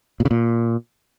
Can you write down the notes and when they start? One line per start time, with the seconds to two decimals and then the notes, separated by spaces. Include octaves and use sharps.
0.20 A#2
0.25 C#3
0.31 A#2